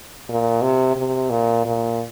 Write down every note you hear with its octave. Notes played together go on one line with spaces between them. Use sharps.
A#2
C3
C3
A#2
A#2